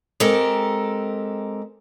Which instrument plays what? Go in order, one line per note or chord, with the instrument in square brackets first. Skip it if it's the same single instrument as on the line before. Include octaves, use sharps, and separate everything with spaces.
[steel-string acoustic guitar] G#3 C4 G4 A4 A#4